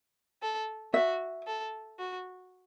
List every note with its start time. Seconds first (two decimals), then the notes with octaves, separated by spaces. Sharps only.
0.42 A4
0.94 F#4 E5
1.47 A4
1.99 F#4